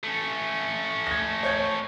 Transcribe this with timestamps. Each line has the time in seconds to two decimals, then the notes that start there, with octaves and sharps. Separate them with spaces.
0.04 A3 C#4
1.07 G#6 A#6
1.43 C#5 G6 G#6